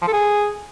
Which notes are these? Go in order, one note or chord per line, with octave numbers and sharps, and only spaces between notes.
F3
A4
G#4